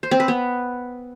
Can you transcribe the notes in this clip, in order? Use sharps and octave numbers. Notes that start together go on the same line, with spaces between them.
C5
C4
B4
B3